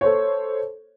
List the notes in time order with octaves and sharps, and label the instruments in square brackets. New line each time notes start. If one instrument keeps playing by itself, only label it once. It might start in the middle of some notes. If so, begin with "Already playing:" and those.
[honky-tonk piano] A4 C5 C#5